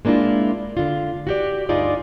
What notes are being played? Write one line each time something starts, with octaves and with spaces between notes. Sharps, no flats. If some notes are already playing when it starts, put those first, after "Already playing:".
G#3 A#3 D4 E4 F4
D3 F4
F#4 G4 D5
D2 G2 D#4 F4 G#4 D5